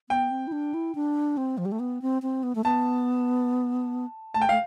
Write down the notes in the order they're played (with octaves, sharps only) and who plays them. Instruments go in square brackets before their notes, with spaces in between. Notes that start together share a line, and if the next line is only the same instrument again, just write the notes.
[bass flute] B3 [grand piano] G5
[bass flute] C4
E4
D4
E4
D4
C4
F3
G3
A3
B3
C4
C4
B3
A3
[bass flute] B3 [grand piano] A5
[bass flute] A3 [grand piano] A5
[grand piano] G5
[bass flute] A3 [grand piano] F5